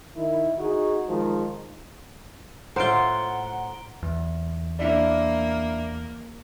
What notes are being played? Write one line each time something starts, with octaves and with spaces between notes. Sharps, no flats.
D#3 E4
D#4 F#4 G#4
D#3 F3 G#3
A2 F4 C5 F#5 A#5 D7 G7
E2
A#3 D4 E4 D5